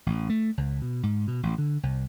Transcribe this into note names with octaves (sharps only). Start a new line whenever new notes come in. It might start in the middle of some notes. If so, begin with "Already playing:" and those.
A1
A3
C#2
B2
G#2
B2
A1
D3
C2